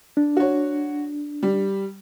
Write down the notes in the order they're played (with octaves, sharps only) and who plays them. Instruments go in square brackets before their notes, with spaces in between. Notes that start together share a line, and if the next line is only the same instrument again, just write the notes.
[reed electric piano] D4
[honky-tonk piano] F#4 C#5
G3